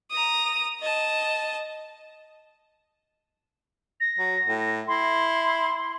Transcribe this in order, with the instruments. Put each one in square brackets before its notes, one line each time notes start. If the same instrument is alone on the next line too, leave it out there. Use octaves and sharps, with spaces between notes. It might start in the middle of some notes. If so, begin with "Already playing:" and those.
[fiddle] A#5 D#6
D#5 A5
[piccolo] A#6
[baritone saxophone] F#3
A2
[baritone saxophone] E4 [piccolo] C6